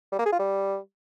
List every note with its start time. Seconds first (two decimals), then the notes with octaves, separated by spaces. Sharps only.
0.12 G3
0.19 A#3
0.26 G#4
0.32 F4
0.39 G3